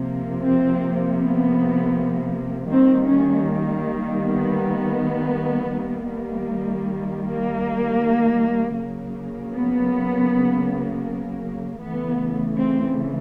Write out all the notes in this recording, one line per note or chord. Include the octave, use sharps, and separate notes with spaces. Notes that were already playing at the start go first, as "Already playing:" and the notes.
Already playing: C3 F3 A#3
C4
B3
D#3 G3 A#3 C4
C#4
B3
D#3 G3 A#3
A#3
C#3 F#3 A#3
B3
C#3 E3 A3 B3
C4